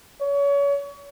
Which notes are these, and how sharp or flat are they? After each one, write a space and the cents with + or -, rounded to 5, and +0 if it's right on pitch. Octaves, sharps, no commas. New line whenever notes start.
C#5 +30